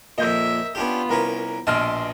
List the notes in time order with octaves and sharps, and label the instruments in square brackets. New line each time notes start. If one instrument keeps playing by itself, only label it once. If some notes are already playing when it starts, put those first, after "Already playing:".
[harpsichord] F2 A#2 [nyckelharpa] A#4 E5 [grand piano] D#5 G6
[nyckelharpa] B3 F4 [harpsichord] C#4 D4 G4
[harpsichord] C2 C#4 B4 [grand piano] A#4 A#5
[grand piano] A#1 D#5 F6 [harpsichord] B2 A5 [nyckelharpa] C6